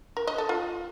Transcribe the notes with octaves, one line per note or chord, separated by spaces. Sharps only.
A#4
D#5
A4
F4